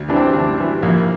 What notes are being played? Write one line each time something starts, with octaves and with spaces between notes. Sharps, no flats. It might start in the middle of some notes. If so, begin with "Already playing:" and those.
Already playing: D2
C3 E3 D4
C4
D2 D4
C3 E3
A#1 A#3